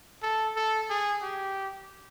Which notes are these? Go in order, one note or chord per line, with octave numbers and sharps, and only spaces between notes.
A4
A4
G#4
G4